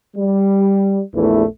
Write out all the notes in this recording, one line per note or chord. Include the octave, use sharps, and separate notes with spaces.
G3
A#1 E2 E3 A3